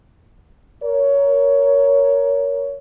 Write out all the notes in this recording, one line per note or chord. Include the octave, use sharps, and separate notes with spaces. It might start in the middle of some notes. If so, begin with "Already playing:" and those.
A#4 C#5